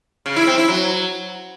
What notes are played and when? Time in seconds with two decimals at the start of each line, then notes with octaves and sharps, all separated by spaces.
0.26 C#3
0.36 E4
0.47 C4
0.58 E4
0.68 F#3